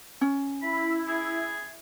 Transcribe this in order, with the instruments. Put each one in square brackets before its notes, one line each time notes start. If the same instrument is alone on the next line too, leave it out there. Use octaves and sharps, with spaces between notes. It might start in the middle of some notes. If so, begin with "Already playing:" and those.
[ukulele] C#4
[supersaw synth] E4 [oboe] B5
[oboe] G#4